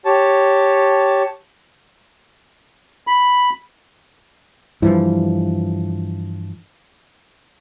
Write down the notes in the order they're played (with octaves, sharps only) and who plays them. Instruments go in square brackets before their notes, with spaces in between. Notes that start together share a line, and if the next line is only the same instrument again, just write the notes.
[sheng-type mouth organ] G4 C#5 A5
[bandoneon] B5
[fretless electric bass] G2 E3 F3